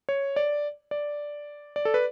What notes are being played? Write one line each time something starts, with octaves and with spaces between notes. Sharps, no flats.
C#5
D5
D5
D5
A4
B4